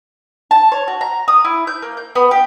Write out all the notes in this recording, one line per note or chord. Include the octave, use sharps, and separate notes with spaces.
A5
C#5
F#4
A#5
D#6
E4
G6
A#3
G6
B3
G4